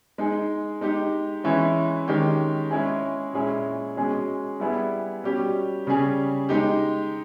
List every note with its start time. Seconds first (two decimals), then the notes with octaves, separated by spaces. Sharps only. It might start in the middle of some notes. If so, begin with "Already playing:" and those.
0.18 G#3 D#4 G#4
0.81 G#3 D#4 G4
1.44 E3 G#3 C#4 E4
2.07 D#3 G#3 C#4 G4
2.71 G#3 C#4 E4 G#4
3.34 A#2 G#3 C#4 E4 G#4
3.97 B2 G#3 C#4 G#4
4.60 G3 B3 E4 G#4
5.24 B2 G3 C#4 G4
5.87 C#3 G3 C#4 G#4
6.49 G#3 D#4 G4